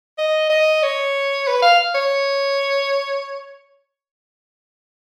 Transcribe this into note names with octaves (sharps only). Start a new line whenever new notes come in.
D#5
D#5
C#5
B4
F5
C#5